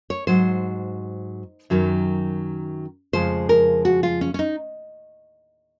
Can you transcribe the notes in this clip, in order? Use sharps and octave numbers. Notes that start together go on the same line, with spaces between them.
C#5
G#2 F#3 C5
F#2 D#3 F#3
F2 C#3 F3 G#3 C5
A#4
F#4
F4
C#4
C#4
D#4